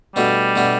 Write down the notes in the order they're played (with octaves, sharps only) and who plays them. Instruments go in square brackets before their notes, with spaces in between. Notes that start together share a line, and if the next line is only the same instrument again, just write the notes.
[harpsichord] B2 A3 D4 F#4 A4 [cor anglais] G3
[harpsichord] B2 A3 D4 F#4 A4